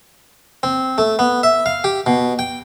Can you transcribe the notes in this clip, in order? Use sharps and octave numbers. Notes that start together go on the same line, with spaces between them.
C4
A3
B3
E5
F5
G4
B2
G5